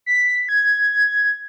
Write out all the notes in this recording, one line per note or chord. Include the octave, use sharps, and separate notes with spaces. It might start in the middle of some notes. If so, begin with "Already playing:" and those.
B6
G#6